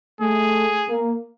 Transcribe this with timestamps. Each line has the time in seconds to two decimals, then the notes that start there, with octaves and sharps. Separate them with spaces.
0.21 A3 G#4
0.89 A#3